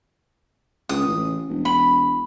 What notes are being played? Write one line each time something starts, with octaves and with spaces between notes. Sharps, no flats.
C#2 D#6
A1
E1
B5